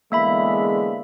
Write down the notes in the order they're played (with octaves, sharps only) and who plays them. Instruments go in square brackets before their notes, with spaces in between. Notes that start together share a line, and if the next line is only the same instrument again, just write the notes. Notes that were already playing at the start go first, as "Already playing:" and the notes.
[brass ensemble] E2 D3 G#3 [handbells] A#3 E5 B5